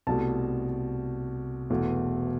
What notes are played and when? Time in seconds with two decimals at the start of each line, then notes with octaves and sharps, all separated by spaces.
0.07 C2 B2 A3 A5
1.70 E1 E2 B2 A3